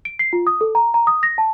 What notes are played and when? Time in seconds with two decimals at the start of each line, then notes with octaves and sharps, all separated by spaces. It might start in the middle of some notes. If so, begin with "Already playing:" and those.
0.05 D7
0.19 C7
0.33 F4
0.47 D#6
0.61 A4
0.75 A#5
0.94 A#5
1.07 D#6
1.23 A#6
1.38 A5